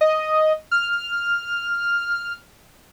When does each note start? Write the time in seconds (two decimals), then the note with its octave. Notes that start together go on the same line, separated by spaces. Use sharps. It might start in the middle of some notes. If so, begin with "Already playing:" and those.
0.01 D#5
0.71 F6